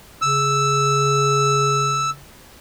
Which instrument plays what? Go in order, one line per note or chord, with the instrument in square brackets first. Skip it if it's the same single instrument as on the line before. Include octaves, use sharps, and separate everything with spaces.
[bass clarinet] C#3 [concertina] E6